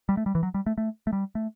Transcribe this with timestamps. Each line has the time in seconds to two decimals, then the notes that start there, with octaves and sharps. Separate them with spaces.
0.09 G3
0.17 A3
0.26 G3
0.35 E3
0.43 F#3
0.54 G3
0.66 A3
0.78 A3
1.07 A3
1.13 G3
1.35 A3